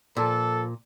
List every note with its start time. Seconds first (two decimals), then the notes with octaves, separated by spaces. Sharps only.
0.17 A#2 F3 A4